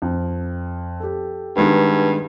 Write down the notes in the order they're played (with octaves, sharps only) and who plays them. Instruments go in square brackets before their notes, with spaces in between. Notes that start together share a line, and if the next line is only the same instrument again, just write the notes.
[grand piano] F2
G4 A4
[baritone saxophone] G2 [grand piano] D#3 G#3 B3